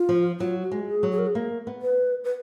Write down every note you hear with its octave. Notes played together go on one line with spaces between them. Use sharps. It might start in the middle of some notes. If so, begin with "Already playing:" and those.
Already playing: F4
F3
F#3 F4
F#4
G#3
G#4
F#3
G#4
A#4
G#4
A#3
B3
B4
B4